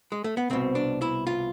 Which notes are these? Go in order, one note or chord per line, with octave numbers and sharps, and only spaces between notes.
G#3
A3
B3
C2 B2 C4
D4
E4
F4